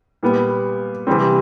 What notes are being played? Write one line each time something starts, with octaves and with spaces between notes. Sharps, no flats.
A#2 G3 B3
C3 E3 G3 C4